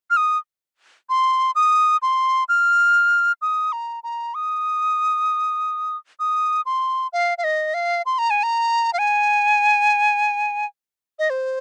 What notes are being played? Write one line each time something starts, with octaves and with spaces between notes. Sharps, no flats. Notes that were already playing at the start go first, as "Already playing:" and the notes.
F6
D#6
C6
D#6
C6
F6
D#6
A#5
A#5
D#6
D#6
C6
F5
F5
D#5
F5
C6
A#5
G#5
A#5
F5
G#5
D#5
C5